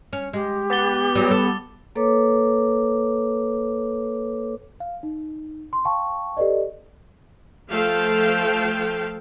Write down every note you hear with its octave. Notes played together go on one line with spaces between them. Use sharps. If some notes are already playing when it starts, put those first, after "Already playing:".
C#4
G#3 G4
B3 D6 A6 G7
F#3 G3
A4
A#3 A4 B4 C#5 D6
F5
D#4
C6
F5 G5 A5 C#6
G4 A4 B4 D5 D#5
F3 A3 A4 F5 G5